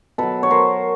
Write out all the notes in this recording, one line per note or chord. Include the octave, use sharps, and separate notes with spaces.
B2 F#3 A4 B4
C#5
A#4 C5